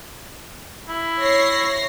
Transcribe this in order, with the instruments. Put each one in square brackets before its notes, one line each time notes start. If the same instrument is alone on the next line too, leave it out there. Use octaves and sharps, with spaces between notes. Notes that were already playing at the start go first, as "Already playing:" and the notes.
[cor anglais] E4
[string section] C#5 A#6 C7